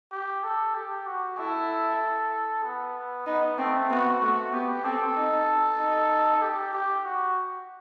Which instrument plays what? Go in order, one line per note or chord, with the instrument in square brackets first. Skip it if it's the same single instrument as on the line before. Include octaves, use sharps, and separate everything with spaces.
[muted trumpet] G4
A4
G4
F#4
[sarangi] E4 [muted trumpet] A4
[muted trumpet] B3
[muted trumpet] B3 [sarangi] D#4
[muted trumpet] A3 [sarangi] C4
[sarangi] B3 [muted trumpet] F#4
[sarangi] A3 [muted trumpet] F#4
[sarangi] B3 [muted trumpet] G4
[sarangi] C4 [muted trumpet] A4
[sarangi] D#4
D#4
[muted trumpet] G4
G4
F#4